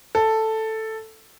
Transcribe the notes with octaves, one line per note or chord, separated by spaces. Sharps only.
A4